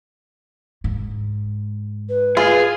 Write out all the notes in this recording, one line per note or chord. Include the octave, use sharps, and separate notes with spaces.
G#2
B4
F4 G#4